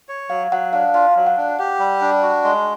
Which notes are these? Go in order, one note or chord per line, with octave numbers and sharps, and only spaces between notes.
C#5
F#3 F5
F#3 F#5
D4 F5
F4 F5
F#3
F#5
D4
G4 F#5
G3
D4
F#4
G#3